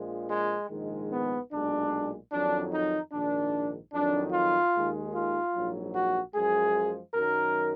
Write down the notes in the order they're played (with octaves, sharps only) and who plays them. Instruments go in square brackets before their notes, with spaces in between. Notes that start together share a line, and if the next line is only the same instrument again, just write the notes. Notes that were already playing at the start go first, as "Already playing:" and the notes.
Already playing: [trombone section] A#1 A#2 F3 G#3
G#3
A#1 G#2 D#3 G#3
B3
B1 A#2 G#3 D4
F2 D#3 F#3 D4
D#4
A#1 G#2 D#3 D4
F2 D#3 F#3 D4
F4
D#2 D#3 G#3
F4
A#1 G#2 F#3
F#4
F#2 F3 G#3 G#4
F#2 D#3 F#3 A#4